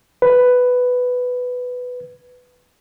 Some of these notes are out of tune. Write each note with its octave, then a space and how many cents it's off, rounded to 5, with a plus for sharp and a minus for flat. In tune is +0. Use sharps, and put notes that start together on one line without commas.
B4 +5